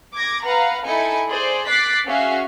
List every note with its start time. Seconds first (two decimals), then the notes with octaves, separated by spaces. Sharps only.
0.15 D6 G#6 A#6
0.44 B4 F5 F#5 A#5
0.85 D#4 E4 A4 G#5 C#7
1.29 G#4 C5 D5
1.66 D6 F#6 A6 B6 C7
2.07 C#4 F#4 G#4 E5 F5